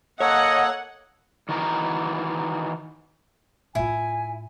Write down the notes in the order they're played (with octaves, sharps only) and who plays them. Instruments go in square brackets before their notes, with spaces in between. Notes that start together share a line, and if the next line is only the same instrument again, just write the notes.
[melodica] A#3 A4 [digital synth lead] C#5 [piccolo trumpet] D#5 [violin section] F#5
[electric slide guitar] D#3 E3 F#4 A#4 G#5 A#5
[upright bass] A2 F4 [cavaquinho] E4 [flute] G#5